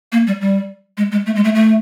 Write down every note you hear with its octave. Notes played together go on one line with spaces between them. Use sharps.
A#3
G3
G3
G#3
G#3
A3
G#3
A3
A3